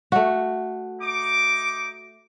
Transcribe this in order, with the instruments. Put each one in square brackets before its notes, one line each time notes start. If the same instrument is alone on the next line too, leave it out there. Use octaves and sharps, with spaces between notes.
[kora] A3 F#4
[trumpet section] D#4 D6